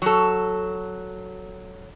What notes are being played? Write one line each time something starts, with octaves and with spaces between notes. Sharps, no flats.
F#3 A4